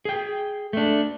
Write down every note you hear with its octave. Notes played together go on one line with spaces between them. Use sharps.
G#4 G5
A3 D4